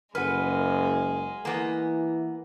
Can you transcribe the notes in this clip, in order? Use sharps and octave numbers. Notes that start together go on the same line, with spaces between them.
F#1 G#3 A#4 B4 F#5
E3 A#3 B3